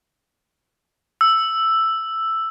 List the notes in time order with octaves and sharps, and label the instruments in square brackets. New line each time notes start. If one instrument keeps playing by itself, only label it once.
[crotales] E6